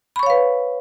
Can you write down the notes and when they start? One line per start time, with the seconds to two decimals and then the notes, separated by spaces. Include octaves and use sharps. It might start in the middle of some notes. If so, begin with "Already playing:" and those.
0.16 B5
0.19 C#6
0.23 C#5
0.26 F5
0.30 B4